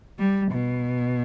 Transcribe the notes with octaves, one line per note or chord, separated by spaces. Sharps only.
G3
B2